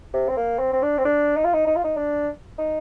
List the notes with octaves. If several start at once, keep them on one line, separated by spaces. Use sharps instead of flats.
C3
C4
A#3
C4
C4
D4
C4
D4
D#4
F4
D#4
D#4
F4
D#4
D4
D#4